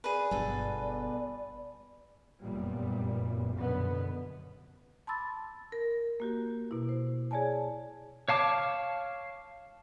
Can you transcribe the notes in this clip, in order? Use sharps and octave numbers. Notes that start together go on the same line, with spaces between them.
G#4 B4 D5
G1 B2 A4 D5
F1 F#2 A#2 G3 B3
A#1 F#2 B2 D3 B3
A5 B5 C6 D6 E6 A6
A#4
A#3 F#4 G4
B2 E4
C5
G#4 C#5 D5 G#5 A5
C#5 F5 A5 D6